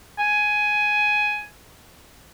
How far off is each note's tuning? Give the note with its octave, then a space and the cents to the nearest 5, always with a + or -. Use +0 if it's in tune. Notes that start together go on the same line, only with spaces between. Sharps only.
G#5 +10